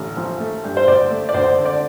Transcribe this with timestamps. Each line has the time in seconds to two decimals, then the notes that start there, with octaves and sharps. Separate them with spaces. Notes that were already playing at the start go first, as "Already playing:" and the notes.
Already playing: A1 D3
0.17 F3
0.40 A3
0.64 G2
0.77 C5
0.87 D2 D5
1.10 A3
1.29 D5
1.34 D2 C5
1.58 D3
1.65 D5